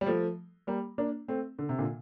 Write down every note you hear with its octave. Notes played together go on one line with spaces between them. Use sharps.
G3
F3 A3
G3 A#3
A#3 D4
A3 C4
D3
C3
A#2 D3